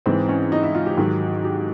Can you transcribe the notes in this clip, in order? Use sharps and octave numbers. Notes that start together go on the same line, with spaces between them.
G#2 E3 C4
C#4
D#4
E4
F4
G4
G#2 D#3 F#3
G4